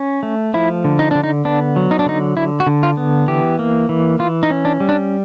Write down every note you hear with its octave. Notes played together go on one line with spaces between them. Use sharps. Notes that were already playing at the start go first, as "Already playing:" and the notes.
Already playing: C#4
A3
F3 E4
D3
D#4
D3 D4
D#4
B3 D4
F#3
D#4
D4
D3 D#4
D3 E4
F#4
D3
F4
B3
E3 G4
A#3
E3
E3 F4
D#4
C#4
D4
G3
D4